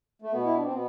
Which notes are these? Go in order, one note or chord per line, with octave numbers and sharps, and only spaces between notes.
A3
B2 B3
E4
D4
C4
B2 B3